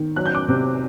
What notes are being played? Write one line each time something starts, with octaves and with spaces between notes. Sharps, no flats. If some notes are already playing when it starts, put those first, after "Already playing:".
Already playing: D#3
F#3 F#6
G6
D6 F#6
C3